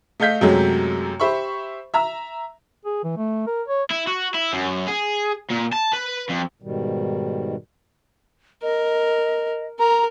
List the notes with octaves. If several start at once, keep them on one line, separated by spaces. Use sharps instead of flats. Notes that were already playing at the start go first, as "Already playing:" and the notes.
A3 A4 D#5 F5 G6 B6
F#2 C3 F#3 G#3 A3
G4 C5 E5 B5 C#6
E5 A#5 E6
G#4
E3
A3
A#4
C#5
E4
F#4
E4
F#2
G#4
A#2
A5
B4
F2
G#2 B2 D#3 G3
A#4 D#5
A#4 A#5